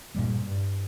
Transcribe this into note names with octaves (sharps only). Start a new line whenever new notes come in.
G2 A#2 G3 A#3
G2